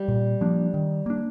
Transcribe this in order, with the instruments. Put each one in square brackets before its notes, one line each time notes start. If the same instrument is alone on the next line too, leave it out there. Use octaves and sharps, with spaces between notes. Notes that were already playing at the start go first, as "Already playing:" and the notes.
Already playing: [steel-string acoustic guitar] G3
[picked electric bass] A#2
F3 A#3 D4
D#3
A#3 D4